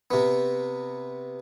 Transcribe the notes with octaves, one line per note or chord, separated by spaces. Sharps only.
C3 B3